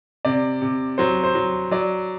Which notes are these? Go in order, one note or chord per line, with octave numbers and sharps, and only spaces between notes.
C3 D5
C3
F#3 C5
C5
F#3
F#3 D5